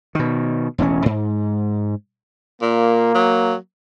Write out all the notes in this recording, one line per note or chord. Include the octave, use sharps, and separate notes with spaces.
B2 D#3
E1 A1 C4 C#4
G#2
A#2 A#3
F#3